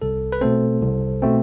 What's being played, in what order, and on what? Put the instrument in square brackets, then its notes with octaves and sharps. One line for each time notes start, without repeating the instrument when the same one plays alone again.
[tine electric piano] C2 A4
B4
B2 A3 C4 A4 C5
C2
B2 A3 C4